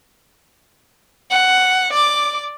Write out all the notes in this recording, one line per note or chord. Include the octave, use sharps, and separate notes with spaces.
F#5
D5 D6